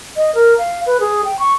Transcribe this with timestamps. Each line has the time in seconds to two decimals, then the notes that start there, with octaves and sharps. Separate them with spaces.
0.17 D#5
0.35 A#4
0.58 F5
0.86 B4
1.00 G#4
1.25 G5
1.39 C#6